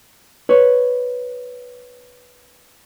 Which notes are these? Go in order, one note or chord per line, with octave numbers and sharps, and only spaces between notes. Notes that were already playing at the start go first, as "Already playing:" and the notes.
B4 C#5